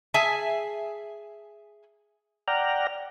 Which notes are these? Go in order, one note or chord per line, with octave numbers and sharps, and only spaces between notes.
G#4 E5 G#5 A5
D5 F#5 G5 A#5 F6